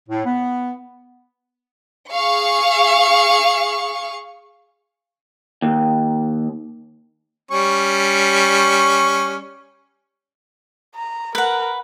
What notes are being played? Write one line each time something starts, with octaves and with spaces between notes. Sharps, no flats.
A2
B3
G#4 F5 C#6
D#2
G3 C#4 C#6
A#5
A#4 B4 F#5